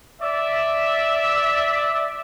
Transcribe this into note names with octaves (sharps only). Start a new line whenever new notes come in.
D5 E5